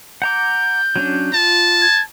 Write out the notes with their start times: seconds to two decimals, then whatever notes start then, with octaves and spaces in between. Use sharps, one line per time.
0.22 F#5 A#5 D6 G6
0.96 F#3 C#4 D4
1.34 F4 A5
1.82 G#6